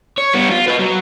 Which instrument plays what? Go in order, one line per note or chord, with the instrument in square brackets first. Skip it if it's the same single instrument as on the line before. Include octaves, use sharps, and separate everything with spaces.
[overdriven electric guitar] C#5
G3 B3
F4
B4 D#5
F#3